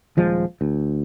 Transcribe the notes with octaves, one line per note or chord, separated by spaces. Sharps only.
D#1 F3 G#3
D2